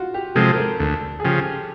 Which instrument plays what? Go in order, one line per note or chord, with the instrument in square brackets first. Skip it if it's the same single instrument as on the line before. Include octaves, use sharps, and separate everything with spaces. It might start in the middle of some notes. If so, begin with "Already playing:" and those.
Already playing: [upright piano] F4 F#4
G4
[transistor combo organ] C3 F3 G#3 [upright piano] A4
[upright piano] A#4
A4
[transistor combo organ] D2 [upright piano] A4
[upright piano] G#4
[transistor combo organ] C#3 F3 [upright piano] G4